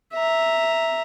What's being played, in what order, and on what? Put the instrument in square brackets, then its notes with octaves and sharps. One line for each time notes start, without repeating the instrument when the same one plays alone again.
[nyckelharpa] E5 A#5